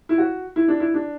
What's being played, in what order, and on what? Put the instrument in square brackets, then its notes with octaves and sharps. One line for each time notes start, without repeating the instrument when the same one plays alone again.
[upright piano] E4
F#4
E4
D4
E4
D4